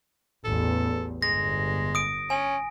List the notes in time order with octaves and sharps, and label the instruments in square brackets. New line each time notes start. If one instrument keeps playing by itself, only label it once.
[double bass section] A1 E2 [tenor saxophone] A4
[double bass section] G1 [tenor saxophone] G#3 [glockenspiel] A#6
[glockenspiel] D#6 D7
[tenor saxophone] C#4 [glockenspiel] G#5